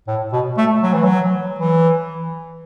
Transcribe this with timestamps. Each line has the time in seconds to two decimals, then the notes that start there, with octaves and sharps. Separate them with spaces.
0.08 A2
0.33 B2
0.57 A3
0.83 F#3
0.93 E3
1.04 F#3
1.59 E3